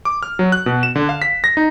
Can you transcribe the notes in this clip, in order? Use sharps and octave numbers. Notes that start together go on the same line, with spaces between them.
D6
F6
F#3
F#6
B2
E7
D3
F5
B6
A#6
D#4